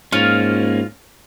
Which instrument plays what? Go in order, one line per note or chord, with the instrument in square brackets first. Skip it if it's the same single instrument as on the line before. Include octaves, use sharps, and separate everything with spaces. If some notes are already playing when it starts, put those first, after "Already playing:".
[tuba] G#2 [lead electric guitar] A#3 C#4 [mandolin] F4